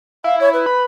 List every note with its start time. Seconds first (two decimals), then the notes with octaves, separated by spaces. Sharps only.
0.24 E4 F5
0.40 E4 C#5
0.53 B4
0.66 B5